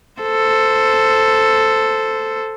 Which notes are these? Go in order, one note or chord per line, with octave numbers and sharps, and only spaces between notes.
A4 C5